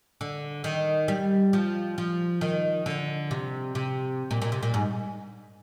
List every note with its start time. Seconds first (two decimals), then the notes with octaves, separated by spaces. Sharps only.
0.21 D3
0.64 D#3
1.08 G3
1.53 F3
1.98 F3
2.41 D#3
2.86 D3
3.31 C3
3.75 C3
4.31 A#2
4.42 A#2
4.52 C3
4.63 A#2
4.74 G#2